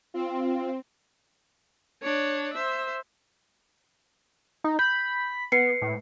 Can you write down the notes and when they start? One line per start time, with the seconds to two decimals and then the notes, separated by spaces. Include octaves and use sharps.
0.14 C4 F4
2.03 D4 C#5
2.53 C5 E5
4.64 D#4
4.79 B5 G6
5.52 B3 B4 C7 C#7
5.82 A2